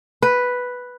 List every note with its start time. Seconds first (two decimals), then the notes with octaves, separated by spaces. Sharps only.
0.22 B4